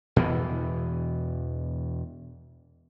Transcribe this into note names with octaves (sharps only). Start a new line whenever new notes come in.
E2 B2 E3 B3